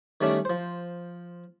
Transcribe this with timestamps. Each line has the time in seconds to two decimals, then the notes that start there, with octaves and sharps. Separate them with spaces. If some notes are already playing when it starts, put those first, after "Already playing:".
0.21 D#3 G3 A3 C#4 D4
0.45 F3 C5